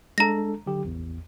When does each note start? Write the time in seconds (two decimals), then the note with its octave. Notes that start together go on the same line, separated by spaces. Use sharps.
0.18 G#3 D4 A4 A#5 A#6
0.66 D3 F#3 G4
0.84 A1 E2